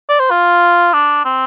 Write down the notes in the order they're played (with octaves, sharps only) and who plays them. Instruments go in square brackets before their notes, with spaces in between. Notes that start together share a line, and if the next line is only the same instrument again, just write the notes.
[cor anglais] D5
C5
F4
D4
C4